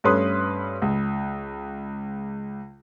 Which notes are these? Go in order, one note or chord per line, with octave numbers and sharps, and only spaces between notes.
G2 A3 C#4 B4 C6 D#6
C#2